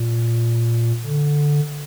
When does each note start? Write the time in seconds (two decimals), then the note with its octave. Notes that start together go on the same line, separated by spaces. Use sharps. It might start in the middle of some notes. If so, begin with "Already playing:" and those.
Already playing: A#2
1.04 D3